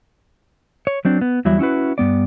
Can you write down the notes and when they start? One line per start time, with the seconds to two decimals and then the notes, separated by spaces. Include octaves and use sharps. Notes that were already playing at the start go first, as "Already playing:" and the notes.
0.87 C#5
1.05 F#3 C4 D4
1.21 B3
1.45 E2 F#3 G3 E4
1.59 C#4 E4 F#4 B4
1.98 G2 B3 D5